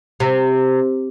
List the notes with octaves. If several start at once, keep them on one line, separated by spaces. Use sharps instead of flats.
C3